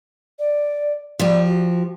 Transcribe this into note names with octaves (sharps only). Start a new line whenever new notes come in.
D5
F3 G4 D5
F#4